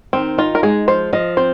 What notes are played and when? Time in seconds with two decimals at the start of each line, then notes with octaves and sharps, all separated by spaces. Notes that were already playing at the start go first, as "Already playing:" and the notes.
0.13 D#3 C4
0.38 D#4 F4
0.55 A#4
0.63 G#3 G#4
0.88 F3 C5
1.13 F3 D#5
1.37 C4 C5